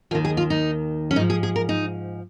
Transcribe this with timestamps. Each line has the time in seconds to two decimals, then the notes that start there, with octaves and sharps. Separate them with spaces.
0.11 D#2 F4
0.15 D#3
0.25 G#4
0.37 F4
0.50 D#4
1.11 C#4
1.16 G#2 F3 D#4
1.30 G#4
1.43 G#4
1.56 A#4
1.69 D#4